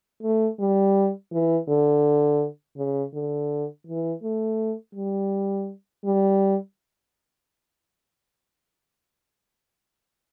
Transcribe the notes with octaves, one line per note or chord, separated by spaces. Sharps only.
A3
G3
E3
D3
C#3
D3
E3
A3
G3
G3